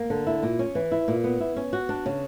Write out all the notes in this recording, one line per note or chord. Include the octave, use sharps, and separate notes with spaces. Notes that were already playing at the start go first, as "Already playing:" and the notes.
Already playing: A#3
D3
E4
A#2
C#4
E3
E4
A#2
B3
E4
C#4
F#4
D4
C#3